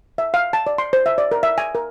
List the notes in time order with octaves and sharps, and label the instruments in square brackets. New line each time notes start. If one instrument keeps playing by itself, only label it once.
[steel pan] E5
F5
A5
D5
C6
C5
E5
D5
A#4
E5
G#5
A#4